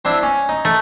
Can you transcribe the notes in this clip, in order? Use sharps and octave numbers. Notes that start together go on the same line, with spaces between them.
C4 D4 E4
C#4
D#4
A3